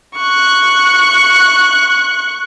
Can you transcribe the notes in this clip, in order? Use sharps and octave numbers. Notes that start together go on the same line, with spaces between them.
C#6 F#6